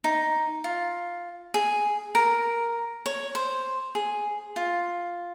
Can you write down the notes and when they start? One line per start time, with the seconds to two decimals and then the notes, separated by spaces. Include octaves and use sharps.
0.04 D#4
0.64 F4
1.54 G#4
2.15 A#4
3.06 C#5
3.35 C5
3.95 G#4
4.56 F4